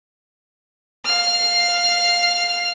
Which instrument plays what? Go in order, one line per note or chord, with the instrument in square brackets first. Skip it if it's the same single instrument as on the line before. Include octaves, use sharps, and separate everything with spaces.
[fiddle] F5 F6